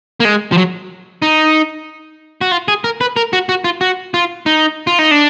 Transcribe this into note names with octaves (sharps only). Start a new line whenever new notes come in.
A#3
G#3
F3
F#3
D#4
F#4
F4
G#4
A#4
B4
A#4
F#4
F#4
F4
F#4
F4
D#4
F4
D#4
D4